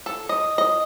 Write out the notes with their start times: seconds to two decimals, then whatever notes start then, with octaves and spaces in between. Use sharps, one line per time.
0.06 A4
0.29 D#5
0.58 D#5